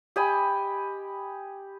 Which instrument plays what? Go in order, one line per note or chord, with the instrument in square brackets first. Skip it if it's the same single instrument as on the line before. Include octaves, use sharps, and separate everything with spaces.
[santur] G4 D#5 G#5 B5